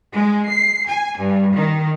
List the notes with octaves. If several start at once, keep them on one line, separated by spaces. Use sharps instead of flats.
G#3
C7
G#5
G2
D#3